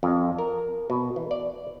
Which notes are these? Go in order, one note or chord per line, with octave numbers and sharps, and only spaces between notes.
F2
A#4
B2
E3
D5